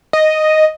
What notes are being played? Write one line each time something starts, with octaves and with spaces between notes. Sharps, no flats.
D#5